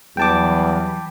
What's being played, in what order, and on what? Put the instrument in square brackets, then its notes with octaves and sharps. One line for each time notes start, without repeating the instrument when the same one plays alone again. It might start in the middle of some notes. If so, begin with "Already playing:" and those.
[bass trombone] E2 [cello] E3 [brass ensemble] F#3 G3 [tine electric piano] G5 A5 D6